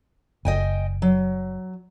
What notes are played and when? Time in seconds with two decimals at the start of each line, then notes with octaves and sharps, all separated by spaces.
0.45 F#1 D#5 G5 G#5
1.02 F#3